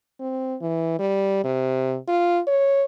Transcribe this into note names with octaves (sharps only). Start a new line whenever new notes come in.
C4
E3
G3
C3
F4
C#5